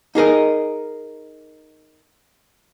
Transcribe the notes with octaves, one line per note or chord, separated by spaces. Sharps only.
D#4 G#4 A#4 D#5